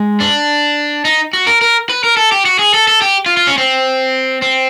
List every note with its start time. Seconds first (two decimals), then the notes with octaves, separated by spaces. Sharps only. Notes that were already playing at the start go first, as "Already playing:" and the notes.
Already playing: G#3
0.20 D4
1.05 D#4
1.33 F#4
1.47 A#4
1.61 A#4
1.89 B4
2.04 A#4
2.17 A4
2.32 G4
2.45 F#4
2.59 G#4
2.74 A4
2.88 A4
3.02 G4
3.26 F4
3.37 F4
3.47 C#4
3.58 C4
4.42 C4